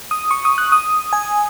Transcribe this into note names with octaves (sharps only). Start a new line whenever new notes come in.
D#6
C#6
D#6
F#6
D#6
G#5